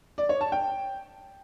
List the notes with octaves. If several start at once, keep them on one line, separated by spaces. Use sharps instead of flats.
D5
C#5
A5
G5